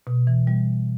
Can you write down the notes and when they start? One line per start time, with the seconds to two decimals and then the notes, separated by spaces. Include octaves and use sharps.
0.07 B2
0.27 E3
0.47 G3